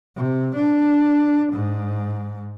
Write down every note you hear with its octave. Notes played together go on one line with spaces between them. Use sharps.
C3
D4
G#2